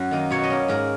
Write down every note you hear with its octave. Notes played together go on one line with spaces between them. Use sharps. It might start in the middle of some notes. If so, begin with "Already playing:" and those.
Already playing: F#2 C#4
D#3 A#3 D#4
B2 C#5
D#5
A#3 C#4
G#2 A#4